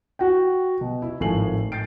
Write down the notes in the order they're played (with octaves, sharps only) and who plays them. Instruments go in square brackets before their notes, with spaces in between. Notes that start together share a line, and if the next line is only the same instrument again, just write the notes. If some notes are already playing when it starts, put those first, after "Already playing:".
[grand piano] F#4 F#5 G5
B2
E4
G#1 A2 F3 G#5 C7 F#7
G6 A6 C7 D7